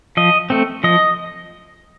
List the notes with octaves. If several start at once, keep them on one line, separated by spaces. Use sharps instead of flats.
F3 D#5
A3 C4
F3 D#5